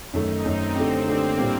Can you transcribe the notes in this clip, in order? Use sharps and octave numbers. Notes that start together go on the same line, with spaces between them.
F#2 D#3 A3 D#4
F#2 D#3 A3 C4
D3 A3 D4 G4
D3 A3 A#3 D4 G4
A2 G3 D4 G4